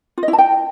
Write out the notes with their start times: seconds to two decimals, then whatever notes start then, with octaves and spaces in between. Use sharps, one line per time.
0.18 F4
0.23 D#5
0.28 E4
0.33 A5
0.38 G5